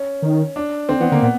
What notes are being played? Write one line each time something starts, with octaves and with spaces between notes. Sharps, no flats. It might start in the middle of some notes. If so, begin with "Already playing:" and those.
Already playing: C#4
D#3
D4
D3 C4
E3 B3
D3 A#3
A#2 B3